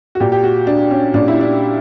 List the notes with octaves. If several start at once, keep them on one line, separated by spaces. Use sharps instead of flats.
F#4
A#2 G4
G4
F#4
D4
C#4
A#2 D4
E4
D4